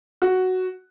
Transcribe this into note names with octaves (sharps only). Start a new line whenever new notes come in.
F#4